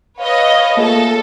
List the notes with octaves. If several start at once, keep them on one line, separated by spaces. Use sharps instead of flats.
B4 C#5 D#5 F5
A3 A#3 F4 G#4 A4 A5